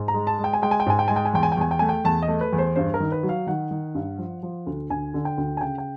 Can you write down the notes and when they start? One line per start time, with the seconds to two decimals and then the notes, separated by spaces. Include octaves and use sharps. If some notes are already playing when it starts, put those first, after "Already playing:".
Already playing: G#2
0.08 A#5
0.14 G#3
0.27 A5
0.39 G#3
0.44 G5
0.53 G#5
0.62 G#3 G5
0.71 G#5
0.80 G5
0.86 G#2 G#5
0.99 G5
1.08 G#3 G#5
1.16 G5
1.25 G#5
1.34 E2 G5
1.43 G#5
1.52 G5
1.57 E2 G#5
1.71 G5
1.79 A3 G#5
1.89 G5
2.05 E2 A5
2.22 D#5
2.28 A3
2.41 B4
2.53 E2
2.58 C5
2.76 G2 C5
2.94 A#4
3.00 D#3
3.12 B4
3.23 F#3
3.29 F5
3.47 D#3 F#5
3.71 D#3
3.95 G2
4.18 F3
4.43 F3
4.67 D2
4.90 D2 G#5
5.14 D3
5.25 G5
5.38 D2
5.57 G#5
5.61 C#3 G5
5.78 G5